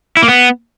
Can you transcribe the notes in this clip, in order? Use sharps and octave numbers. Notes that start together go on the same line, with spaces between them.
E4
A#3
B3